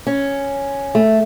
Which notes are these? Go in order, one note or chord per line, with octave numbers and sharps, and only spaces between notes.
C#4
A3